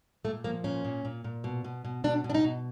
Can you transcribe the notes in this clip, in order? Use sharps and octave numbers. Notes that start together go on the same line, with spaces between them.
A#2 A3
F3 A#3
A#2 C#4
A#2
A#2
A#2
B2
B2
B2
B2 D4
B2
D4
D#4
B2